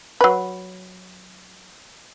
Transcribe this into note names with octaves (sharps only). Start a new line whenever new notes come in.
F#3 B4